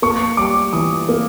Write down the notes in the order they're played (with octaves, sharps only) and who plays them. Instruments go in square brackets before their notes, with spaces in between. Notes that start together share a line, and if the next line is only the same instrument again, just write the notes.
[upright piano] A#3 [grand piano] C#6
[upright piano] G3 [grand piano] D6
[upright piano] E3 [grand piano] D#6
[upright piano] A#3